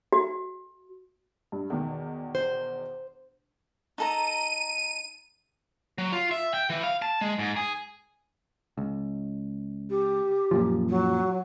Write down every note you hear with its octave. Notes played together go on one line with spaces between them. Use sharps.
F#4
G2
E2 B2 D#3
C5
D#4 A4 A#5 D#7
F#3
F4
E5
G5
E3
F5
A5
G#3
G#2
G#4
C#2
G4
F#2 A#2 F3
F#3